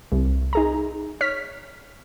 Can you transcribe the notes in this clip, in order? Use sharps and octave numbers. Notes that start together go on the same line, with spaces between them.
C2
D#4 G#4 A#5
C#5 F6 B6